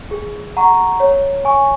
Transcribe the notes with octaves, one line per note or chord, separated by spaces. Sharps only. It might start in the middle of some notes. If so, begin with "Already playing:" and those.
G#4
F#5 A#5 C#6
C#5
G#5 C#6